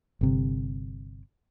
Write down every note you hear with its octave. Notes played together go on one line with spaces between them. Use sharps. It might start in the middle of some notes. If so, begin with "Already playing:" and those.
G1 C3